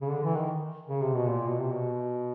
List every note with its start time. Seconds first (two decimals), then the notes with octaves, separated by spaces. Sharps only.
0.02 C#3
0.11 D3
0.23 E3
0.36 D#3
0.88 C#3
1.02 C3
1.14 B2
1.28 A#2
1.47 B2
1.59 C3
1.71 B2